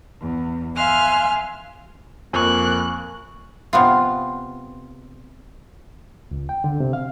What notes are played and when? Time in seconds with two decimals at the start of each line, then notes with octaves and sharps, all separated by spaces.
0.21 E2
0.76 E5 F5 G#5 C6 F6 F#6
2.33 F2 A#3 G#5 C#6 F#6
3.73 C3 B3 F4
6.31 C#2
6.49 G5
6.64 D3
6.80 C3
6.93 F5